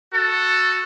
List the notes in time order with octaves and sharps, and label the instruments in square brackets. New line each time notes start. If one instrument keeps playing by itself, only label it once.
[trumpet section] F#4 A4